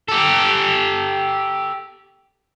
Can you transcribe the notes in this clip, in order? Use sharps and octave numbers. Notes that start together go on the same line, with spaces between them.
G4 A4